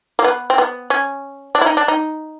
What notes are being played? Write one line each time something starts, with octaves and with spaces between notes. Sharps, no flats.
A#3
B3
C4
B3
C#4
D4
E4
D#4
D4
D#4